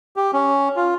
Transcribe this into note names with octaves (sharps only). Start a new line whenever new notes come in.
G4
C#4
F4